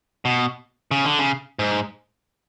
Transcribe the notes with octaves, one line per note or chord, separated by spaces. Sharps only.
B2
C#3
D3
C#3
G#2